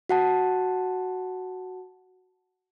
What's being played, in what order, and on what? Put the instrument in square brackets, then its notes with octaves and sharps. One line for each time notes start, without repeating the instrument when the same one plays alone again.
[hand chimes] F#4 F#5 A5